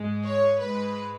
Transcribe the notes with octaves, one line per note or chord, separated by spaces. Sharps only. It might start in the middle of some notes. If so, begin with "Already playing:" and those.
Already playing: G#2 G#3
C#5
G#2 G#3 B4